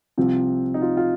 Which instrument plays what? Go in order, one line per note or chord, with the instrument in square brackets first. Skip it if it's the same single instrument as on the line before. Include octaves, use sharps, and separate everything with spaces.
[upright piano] C2 C3 F3 C4
D#4
F4
F4